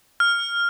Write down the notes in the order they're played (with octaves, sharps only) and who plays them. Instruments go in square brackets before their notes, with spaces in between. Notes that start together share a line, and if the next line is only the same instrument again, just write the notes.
[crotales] F6